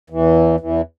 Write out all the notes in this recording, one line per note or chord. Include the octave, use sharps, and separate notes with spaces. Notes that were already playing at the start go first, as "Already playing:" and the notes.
E2 E3
E2 E3